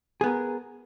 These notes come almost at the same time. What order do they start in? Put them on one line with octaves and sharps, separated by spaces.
G#4 B3 A#4